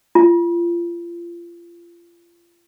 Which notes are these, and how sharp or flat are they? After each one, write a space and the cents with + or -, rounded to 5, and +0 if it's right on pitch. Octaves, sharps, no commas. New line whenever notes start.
F4 -30